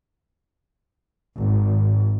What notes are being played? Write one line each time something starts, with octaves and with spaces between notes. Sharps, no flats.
G#1